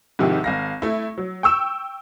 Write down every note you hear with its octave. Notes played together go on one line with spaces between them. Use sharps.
G#2 C3 D#3 F3 E4 G4
G#1 F5 A#6
A3 E4
F#3
G5 C#6 E6 E7